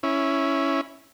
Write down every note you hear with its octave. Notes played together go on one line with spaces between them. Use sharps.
C#4 E4